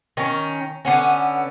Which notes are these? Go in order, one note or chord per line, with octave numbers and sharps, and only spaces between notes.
D#3 C#4
D3 B3 C#4